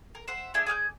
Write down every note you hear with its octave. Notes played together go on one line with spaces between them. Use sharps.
A#4
C5 E5 F#5
D4 E4 G#4 D5
G#4 D5 F6 G6